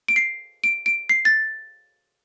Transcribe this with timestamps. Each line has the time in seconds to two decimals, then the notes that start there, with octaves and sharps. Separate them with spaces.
0.08 D7
0.16 C7
0.64 D7
0.86 D7
1.09 C7
1.25 A6